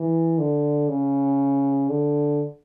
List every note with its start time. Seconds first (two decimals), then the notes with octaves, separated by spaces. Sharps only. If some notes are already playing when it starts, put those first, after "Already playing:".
Already playing: E3
0.39 D3
0.89 C#3
1.89 D3